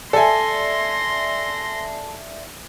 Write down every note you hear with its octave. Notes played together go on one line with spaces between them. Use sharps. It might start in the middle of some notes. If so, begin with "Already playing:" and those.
A4 D5 E5 G#5 C6 A#6